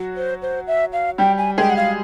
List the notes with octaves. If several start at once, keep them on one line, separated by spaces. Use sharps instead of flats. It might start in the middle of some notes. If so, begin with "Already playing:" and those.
Already playing: F#3 F#4
C5
C5
E5
F5
G3 G4 G5
G#5
G#3 G#4 G5
F#5
F5